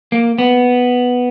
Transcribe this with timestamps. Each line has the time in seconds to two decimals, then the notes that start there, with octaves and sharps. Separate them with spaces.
0.12 A#3
0.39 B3